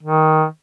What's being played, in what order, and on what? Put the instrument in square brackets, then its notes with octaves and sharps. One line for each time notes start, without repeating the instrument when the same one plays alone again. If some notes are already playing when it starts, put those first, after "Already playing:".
[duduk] D#3